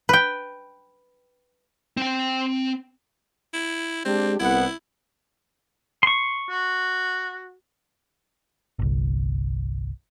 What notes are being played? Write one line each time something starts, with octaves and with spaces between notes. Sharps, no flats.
B4 G5
C4 G5
E4
G#3 C4 D4 G4
C2 B3 E4 F#5
C6 C#6
F#4
G1 C2